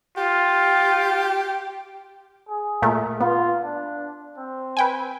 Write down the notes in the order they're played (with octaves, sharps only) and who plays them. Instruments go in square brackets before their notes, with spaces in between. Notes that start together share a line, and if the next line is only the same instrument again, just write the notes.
[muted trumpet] F4 [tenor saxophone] G4
[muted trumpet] G#4
[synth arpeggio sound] A#2 A3 A#4
[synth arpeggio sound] B3 [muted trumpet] F4
[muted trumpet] D4
C4
[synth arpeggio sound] B4 G5 G#5